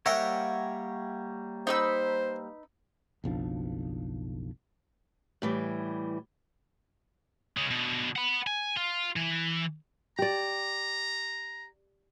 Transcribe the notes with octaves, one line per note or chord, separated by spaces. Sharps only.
G3 A#3 A#4 C#5 E5 F#5 G5
D#4 B4 C5 E6
F#1 B1 F3 D4
A2 E3 G3
C#3 G#3
B2 D3
F#5 B5
G#5
F4
E3
G4 D5 A#5